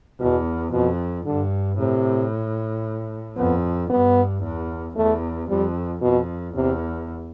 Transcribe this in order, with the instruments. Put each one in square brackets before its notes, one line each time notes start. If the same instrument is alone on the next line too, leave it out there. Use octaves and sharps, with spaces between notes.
[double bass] E2 [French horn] B2
[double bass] F2 [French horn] B2
[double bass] G2 [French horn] D3
[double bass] A2 [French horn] C3
[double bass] F2 [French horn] B3
[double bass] G2 [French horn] B3
[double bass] E2
[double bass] E2 [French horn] A3
[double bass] F2 [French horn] G3
[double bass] F2 [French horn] B2
[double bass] E2 [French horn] C3